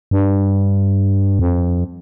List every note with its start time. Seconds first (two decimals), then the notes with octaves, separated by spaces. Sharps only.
0.11 G2
1.39 F2